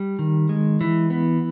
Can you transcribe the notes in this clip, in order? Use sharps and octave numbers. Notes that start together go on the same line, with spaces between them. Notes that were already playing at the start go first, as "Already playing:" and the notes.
Already playing: G3
D#3
G#3
E3
B3